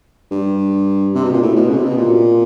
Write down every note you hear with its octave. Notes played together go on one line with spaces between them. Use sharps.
G2
C3
B2
A#2
A2
B2
C#3
C3
B2
A#2